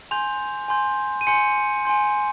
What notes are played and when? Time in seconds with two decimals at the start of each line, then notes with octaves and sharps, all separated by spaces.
0.11 G#5 C6 G6 F7
0.68 G#5 C6 G6
1.21 D#7
1.27 G#5 C6 G6 C#7
1.85 G#5 C6 G6